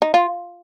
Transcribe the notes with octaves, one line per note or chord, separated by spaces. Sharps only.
D#4
F4